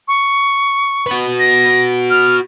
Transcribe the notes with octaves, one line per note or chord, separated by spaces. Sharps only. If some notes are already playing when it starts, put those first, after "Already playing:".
C#6
F#4 B4
A#6
F6